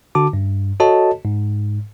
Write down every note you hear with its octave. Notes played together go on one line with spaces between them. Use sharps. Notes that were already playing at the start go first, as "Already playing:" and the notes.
D3 F#4 A5 D6
G2
F#4 A4 C#5 D#5 A5
G#2